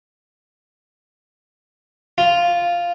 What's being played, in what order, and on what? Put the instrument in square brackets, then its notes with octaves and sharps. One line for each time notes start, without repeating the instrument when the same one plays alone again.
[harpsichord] F4